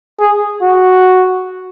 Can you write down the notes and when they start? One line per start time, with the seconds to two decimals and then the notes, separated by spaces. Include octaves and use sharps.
0.19 G#4
0.62 F#4